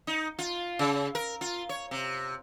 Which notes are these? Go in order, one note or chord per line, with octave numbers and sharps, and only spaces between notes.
D#4
F4
C#3
A#4
F4
C#5
C3